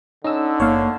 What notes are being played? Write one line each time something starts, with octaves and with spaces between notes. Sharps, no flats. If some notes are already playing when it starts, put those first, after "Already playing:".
D3 C#4 D#4 D#5 E6
F#1 A#3 C#5 F5